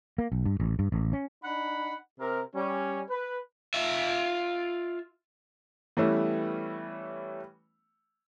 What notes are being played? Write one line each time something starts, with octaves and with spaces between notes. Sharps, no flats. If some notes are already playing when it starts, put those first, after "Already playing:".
A#3
B1
G2
A1
G2
A1
C#4
D4 D#4 F#5 B5
C3 A#4
G3 C#4
B4
F4 E5
E3 G3 A3 B3 C#4 E4